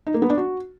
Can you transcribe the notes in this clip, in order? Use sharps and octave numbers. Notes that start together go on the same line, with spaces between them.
D#4
A#3
B3
D4
F#4